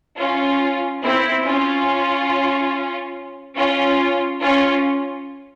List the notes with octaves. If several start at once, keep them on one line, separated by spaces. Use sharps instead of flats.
C#4 F4
C4 E4
C#4 F4
C#4 F4
C#4 F4